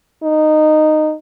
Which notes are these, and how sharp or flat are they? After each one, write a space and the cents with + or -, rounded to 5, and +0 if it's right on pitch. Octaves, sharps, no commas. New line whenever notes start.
D#4 -15